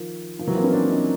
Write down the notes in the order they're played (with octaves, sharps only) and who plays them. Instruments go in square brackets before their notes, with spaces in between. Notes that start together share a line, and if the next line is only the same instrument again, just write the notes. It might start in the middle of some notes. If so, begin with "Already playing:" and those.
Already playing: [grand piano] D#3 F3
D#3 F3
E3 F#3
A#3 C4
B3 C#4
C4 D4
C#4 D#4